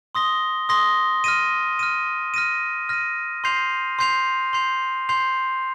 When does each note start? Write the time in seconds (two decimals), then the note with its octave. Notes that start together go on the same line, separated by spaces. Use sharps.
0.15 C6 D#6 A#6 G7
0.69 C6 D#6 A#6 G7
1.24 F6 A#6 D#7
1.79 F6 A#6 D#7
2.34 F6 A#6 D#7
2.89 F6 A#6 D#7
3.44 C6 G6 C7 F7
3.99 C6 G6 C7 F7
4.53 C6 G6 C7 F7
5.09 C6 G6 C7 F7